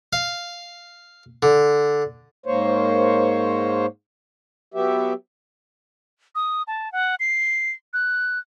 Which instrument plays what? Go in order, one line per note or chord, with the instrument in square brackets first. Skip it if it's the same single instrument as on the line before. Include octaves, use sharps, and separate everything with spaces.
[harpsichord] F5
D3
[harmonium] G#2 A#3 C5 C#5
F#3 B3 G4 E5
[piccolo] D#6
A5
F#5
C7
F#6